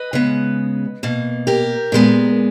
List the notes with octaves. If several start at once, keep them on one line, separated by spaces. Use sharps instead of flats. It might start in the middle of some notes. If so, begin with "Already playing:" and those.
Already playing: B4 D#5
C#3 G#3 B3
B2 A#3
G4 A#4
A#2 G#3 B3